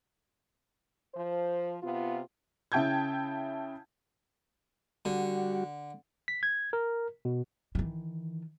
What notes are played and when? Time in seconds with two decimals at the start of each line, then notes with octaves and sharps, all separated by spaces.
1.15 F3 C5
1.82 C3 B3 F4
2.72 C#3 E4 G5 A5 G6 G#6
5.05 D3 G3 F#4
6.28 B6
6.43 G#6
6.73 A#4
7.25 B2
7.75 D#3 E3